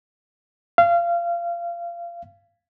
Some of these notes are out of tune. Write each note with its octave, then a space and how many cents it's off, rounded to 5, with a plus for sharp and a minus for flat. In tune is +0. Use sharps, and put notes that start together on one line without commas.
F5 -25